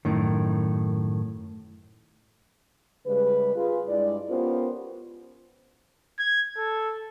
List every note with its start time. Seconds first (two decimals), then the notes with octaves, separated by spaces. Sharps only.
0.05 F#2 A2 D#3
3.07 C#3 G3 G#3 B4
3.56 F4 G#4 B4
3.88 G2 G#3 E4 D5
4.29 B3 C#4 F4 G4 A#4 C5
6.19 G#6
6.57 A4